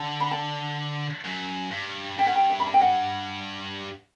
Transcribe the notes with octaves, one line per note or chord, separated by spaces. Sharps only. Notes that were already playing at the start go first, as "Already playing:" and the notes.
Already playing: D3 A5
B5
A5
F#2
G2
G2 G5
F#5
G5
E5
B5
A5
G5
F#5